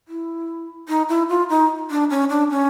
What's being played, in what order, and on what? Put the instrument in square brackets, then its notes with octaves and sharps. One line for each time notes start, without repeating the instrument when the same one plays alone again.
[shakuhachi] E4
D#4
E4
F4
D#4
D4
C#4
D4
C#4